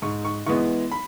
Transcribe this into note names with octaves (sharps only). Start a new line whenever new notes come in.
G#2 C#6
C#6
E3 G#3 B3 C#6
B5